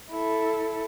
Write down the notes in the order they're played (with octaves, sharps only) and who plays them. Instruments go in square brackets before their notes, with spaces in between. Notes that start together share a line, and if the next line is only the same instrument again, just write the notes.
[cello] E4 A4